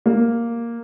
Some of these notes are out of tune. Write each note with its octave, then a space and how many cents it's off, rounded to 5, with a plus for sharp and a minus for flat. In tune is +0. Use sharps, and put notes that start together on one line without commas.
A#3 +0